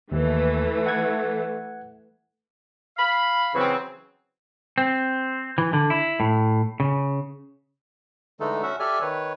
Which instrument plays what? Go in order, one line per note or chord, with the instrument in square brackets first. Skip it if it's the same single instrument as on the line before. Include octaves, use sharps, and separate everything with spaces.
[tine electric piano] D#2 [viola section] E3 A3
[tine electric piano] F#5 G#6
[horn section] F5 B5
C#3 E3 F#3 C4
[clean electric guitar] C4
E3
D3
E4
A2
C#3
[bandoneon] D3 E3 G#3 A3 D#4 A4
C#4 F#4 E5 F#5
G4 A4 D5 E5 G#5 F6
D#3 B4 C#5